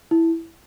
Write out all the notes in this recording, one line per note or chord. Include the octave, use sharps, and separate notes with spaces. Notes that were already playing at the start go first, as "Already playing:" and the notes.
E4